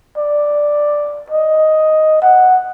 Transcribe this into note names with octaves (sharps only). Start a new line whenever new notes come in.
D5
D#5
F#5